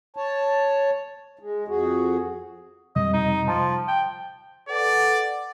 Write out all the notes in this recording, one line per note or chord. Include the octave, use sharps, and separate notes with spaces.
C#5 A5
G#3
F2 F#4 G#4
F2 C3 G3 D#5
D#4
F3 A5
G5
A4 B4 D5 F#5